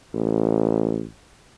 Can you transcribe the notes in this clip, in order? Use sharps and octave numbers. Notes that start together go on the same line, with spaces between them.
A1